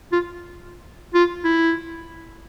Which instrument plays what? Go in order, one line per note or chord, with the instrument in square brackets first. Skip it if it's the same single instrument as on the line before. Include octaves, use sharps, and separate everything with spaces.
[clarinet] F4
F4
E4